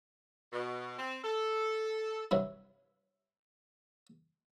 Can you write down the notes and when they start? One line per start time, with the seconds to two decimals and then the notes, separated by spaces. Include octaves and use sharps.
0.53 B2
0.98 C4
1.24 A4
2.31 G2 C3 F#3 E4